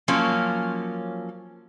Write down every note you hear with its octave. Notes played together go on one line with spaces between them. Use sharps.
F3 F#3 A#3 C#4